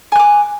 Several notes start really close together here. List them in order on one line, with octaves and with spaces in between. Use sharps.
G#5 F#6 D6